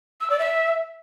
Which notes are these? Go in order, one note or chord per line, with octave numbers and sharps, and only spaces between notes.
E6
D5
E5